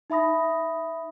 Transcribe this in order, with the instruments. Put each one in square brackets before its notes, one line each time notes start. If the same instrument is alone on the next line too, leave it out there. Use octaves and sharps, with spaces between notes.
[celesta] D#4 E5 B5 D#6 A#6